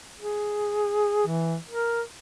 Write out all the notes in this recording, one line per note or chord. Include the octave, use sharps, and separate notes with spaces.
G#4
E3
A#4